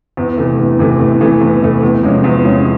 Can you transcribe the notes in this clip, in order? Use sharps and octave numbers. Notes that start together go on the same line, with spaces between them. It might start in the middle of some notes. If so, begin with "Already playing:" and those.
E2
C3 E3 A3
E2
C3 E3 A3
E2
C3 E3 A3
E2
C3 E3 A3
E2
C3 F3 G#3 C#4
E2
C3 F3 G#3 C#4